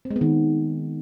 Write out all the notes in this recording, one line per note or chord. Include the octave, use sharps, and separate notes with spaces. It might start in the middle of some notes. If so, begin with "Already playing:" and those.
C4
G#3
B3
D#3